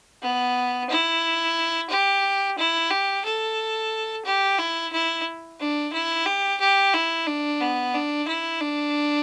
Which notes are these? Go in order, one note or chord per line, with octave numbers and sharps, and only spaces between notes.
B3
E4
G4
E4
G4
A4
G4
E4
E4
D4
E4
G4
G4
E4
D4
B3
D4
E4
D4